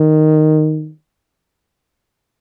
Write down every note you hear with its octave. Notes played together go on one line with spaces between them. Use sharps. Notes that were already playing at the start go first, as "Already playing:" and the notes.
Already playing: D#3